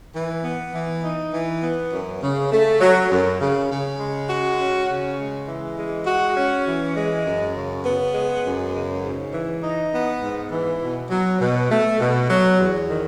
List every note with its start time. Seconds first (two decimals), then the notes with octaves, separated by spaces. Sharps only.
0.15 E3
0.44 B3
0.74 E3
1.04 D#4
1.33 E3
1.63 B3
1.92 F#2
2.22 C#3
2.52 A3
2.81 F#3
3.11 F#2
3.41 C#3
3.70 C#3
3.99 G#3
4.29 F#4
4.59 C#4
4.88 C#3
5.18 G#3
5.48 E3
5.78 G#3
6.07 F#4
6.37 C#4
6.66 E3
6.97 G#3
7.26 F#2
7.55 C#3
7.85 B3
8.15 G#3
8.44 F#2
8.73 C#3
9.04 G#2
9.34 E3
9.63 D#4
9.93 B3
10.22 G#2
10.51 E3
10.81 B2
11.10 F#3
11.41 B2
11.70 A3
12.00 B2
12.30 F#3
12.59 E2
12.89 D#3